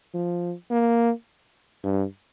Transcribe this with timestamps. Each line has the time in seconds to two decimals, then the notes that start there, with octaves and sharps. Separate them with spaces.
0.14 F3
0.71 A#3
1.84 G2